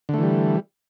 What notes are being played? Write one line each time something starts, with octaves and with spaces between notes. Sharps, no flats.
D3 E3 G3 A3